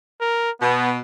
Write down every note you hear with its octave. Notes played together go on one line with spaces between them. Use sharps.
A#4
B2 B3